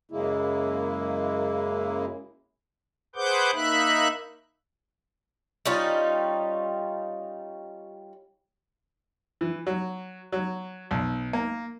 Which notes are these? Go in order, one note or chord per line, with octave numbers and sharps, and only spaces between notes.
F#2 C#3 G#3 A#3 E4
G#4 B4 C5 F#5 D6 G6
A#3 D#4 E5 B5 F#6
G3 C#4 D#4 F4
E3
F#3
F#3
B1
A#3